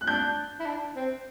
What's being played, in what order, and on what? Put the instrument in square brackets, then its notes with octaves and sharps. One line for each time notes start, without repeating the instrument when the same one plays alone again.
[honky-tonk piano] F#6
[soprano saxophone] D4 [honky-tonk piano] G6
[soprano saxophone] E4
D4
C4